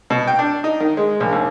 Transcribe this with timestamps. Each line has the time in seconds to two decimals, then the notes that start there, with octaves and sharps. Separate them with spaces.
0.10 B2
0.27 G5
0.39 D4
0.64 D#4
0.80 D#3
0.97 G#3
1.20 A#1
1.32 D#2